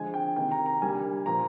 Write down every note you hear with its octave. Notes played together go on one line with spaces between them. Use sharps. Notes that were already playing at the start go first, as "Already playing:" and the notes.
Already playing: D3 F3 G#3 G#5
G5
C3 D#3 A#3 G5
A#5
A#5
D3 G3 A#3 G#5
A#2 F3 A#3 A#5